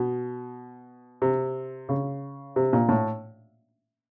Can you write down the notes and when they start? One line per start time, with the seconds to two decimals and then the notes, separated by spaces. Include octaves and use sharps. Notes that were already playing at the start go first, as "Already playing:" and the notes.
Already playing: B2
1.22 C3
1.89 C#3
2.56 C3
2.73 A#2
2.89 A2